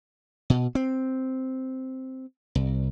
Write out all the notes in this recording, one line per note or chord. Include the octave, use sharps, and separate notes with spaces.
B2
C4
C2